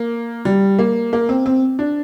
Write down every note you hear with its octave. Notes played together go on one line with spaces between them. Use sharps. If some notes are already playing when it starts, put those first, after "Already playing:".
Already playing: A#3
G3
A#3
A#3
C4
C4
D4